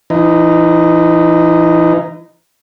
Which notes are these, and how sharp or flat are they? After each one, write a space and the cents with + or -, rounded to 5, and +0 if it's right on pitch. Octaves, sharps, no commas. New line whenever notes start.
E3 +35 D#4 -5